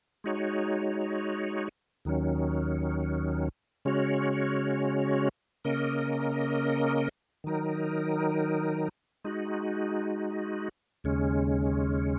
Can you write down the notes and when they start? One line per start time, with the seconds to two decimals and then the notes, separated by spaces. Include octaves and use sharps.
0.24 G#3 D#4 F#4 C#5
2.05 D#2 D#3 F#3 C#4
3.85 C#3 G#3 C#4 F#4 C#5
5.65 C#3 A#3 C#4 A#4 D#5
7.44 D#3 F#3 D#4 A#4
9.25 G#3 D#4 F#4
11.04 D#2 C#3 G#3 C#4